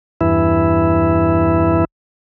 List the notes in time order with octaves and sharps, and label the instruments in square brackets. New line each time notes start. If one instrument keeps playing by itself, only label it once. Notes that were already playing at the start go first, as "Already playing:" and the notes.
[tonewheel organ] E2 G2 E3 E4